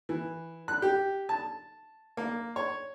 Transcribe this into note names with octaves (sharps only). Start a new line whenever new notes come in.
E3
F#6
G4
A5
A#3
C#5